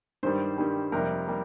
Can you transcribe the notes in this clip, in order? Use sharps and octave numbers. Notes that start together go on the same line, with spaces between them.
G2 D#3 G3 C5
G2 D#3 G3
F2 C3 G3 A#3 A#4
G3 A#3